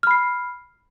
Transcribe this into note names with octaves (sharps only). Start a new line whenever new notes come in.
B5 F6 C7